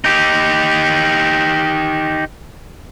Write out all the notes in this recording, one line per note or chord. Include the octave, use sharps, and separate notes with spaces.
D#4 G4